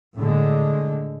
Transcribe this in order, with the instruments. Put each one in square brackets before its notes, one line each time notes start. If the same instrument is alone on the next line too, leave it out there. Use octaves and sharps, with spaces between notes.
[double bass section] A2 D3 G#3